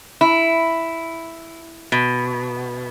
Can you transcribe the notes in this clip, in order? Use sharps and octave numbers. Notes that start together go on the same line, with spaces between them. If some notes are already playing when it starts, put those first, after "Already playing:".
E4
B2